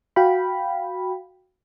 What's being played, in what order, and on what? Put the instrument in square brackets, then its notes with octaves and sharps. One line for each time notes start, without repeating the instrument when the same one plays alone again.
[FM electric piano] F#4 F5 G5 B5